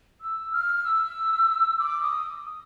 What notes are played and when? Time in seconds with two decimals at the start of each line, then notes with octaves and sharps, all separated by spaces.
0.21 E6
0.52 F6
0.84 E6
1.79 D6
2.02 D#6